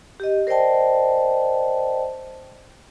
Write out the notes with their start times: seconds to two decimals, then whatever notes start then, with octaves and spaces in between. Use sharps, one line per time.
0.20 G4 D#5
0.47 A#4 C5 D5 D#5 G5 A5